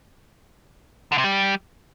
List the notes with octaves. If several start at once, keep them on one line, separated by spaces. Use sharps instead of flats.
D3
C3
G3